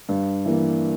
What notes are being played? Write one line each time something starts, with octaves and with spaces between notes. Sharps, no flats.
G2
E3 A#3